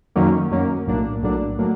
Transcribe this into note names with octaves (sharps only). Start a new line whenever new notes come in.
F#2 D#3 F#3 A#3 C#4
F#2 D#3 F#3 A#3 C#4
B1 A2 F#3 A#3 D4
B1 A2 F#3 A#3 D4
A2 F#3 A#3 D4